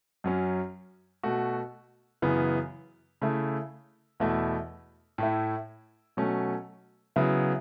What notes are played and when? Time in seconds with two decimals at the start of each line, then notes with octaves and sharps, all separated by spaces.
0.24 F#2 F#3 C#4
1.23 B2 A3 F#4
2.22 F#2 C#3 E3 B3
3.22 C#3 A3 E4
4.20 E2 B2 A3 E4
5.18 A2 A3 E4
6.17 B2 F#3 A3 C#4
7.16 C#3 F#3 B3 E4